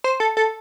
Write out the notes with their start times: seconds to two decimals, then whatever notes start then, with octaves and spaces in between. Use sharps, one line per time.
0.04 C5
0.20 A4
0.37 A4